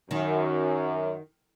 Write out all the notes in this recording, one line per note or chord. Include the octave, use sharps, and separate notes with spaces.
F#2 D#3